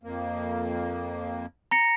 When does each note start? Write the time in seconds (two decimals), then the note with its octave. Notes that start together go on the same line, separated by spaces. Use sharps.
0.03 F2 A#3
1.71 A#5 A#6 C#7